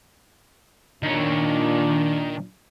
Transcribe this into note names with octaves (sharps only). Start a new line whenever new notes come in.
A#2 D#3 D4 C#5